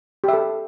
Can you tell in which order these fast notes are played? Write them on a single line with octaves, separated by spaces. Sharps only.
G4 E5 A4